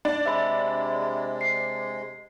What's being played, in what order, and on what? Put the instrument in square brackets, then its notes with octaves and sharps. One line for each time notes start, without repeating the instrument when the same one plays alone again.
[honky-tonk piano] D4
[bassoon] C3 [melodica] G#3 [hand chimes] E5 B5
[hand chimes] C7